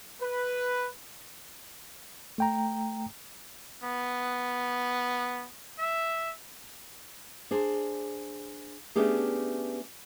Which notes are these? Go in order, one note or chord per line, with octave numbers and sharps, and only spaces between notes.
B4
A3 G5 A#5
B3
E5
D4 G#4 C5
A3 B3 C#4 D4 G4 G#4